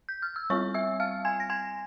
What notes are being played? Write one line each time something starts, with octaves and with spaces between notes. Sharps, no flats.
G6
F6
E6
G3 C4 F4 C#5 C#6
E5 E6
F5 F6
G#5 G#6
A#6
G#5 G#6